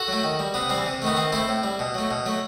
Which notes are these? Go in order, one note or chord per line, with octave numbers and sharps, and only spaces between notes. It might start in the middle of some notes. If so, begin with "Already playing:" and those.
Already playing: F#4 A4
F#3 A3
D#3
G3
C3 B3
E3 G3 C4
C3
D#3 A3 B3
D#3 C4
A3 C4 E4
A2
G3
B2
F#3 A3
B2
F#3 A3